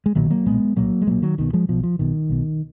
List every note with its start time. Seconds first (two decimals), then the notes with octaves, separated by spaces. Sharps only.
0.06 G#3
0.15 B1 A#2 D#3 F#3
0.30 F#3 A#3
0.46 B1 A#2 G#3 B3
0.76 B1 A#2 F#3 A#3
1.02 G#3
1.07 B1 A#2 F#3 A#3
1.22 D#3 F#3
1.38 B1 B2 D#3
1.53 F3 G#3
1.69 B1 B2 F3
1.83 F3
1.99 B1 B2 D#3
2.29 B1 B2